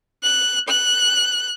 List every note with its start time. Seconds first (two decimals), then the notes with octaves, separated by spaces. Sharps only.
0.23 F#6
0.68 F#6